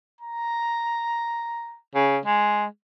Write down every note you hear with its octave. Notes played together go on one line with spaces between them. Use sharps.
A#5
C#3
G#3